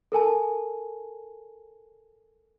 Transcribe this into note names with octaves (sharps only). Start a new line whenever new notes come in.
A4 A#4 G#5 A5